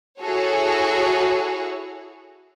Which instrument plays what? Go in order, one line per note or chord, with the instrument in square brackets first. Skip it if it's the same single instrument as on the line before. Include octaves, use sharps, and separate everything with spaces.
[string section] E4 F#4 G#4 A4 C#5